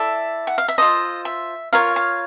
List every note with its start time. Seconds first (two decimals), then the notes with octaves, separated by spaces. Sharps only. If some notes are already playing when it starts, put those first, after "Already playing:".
Already playing: E4 A4 D5 E5
0.47 F#5
0.58 F5
0.68 E5
0.78 F4 A4 C5 D#5
1.25 E5
1.73 F4 A#4 C#5 F5
1.96 F5